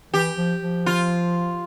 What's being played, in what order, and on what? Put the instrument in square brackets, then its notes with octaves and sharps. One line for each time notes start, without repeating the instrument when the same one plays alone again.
[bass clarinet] E3 [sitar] G4
[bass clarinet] F3
F3
[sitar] F4